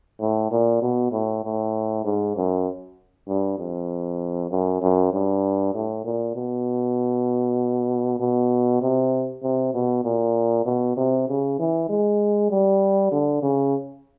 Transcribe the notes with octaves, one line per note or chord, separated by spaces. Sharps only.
A2
A#2
B2
A2
A2
G#2
F#2
G2
F2
F#2
F#2
G2
A2
A#2
B2
B2
C3
C3
B2
A#2
B2
C3
C#3
E3
G#3
G3
D3
C#3